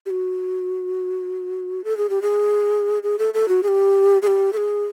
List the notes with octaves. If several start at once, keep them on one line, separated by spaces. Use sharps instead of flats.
G4
F#4
A4
G#4
G4
G#4
G#4
A4
A4
F#4
G#4
G4
G#4
G4
A4
G#4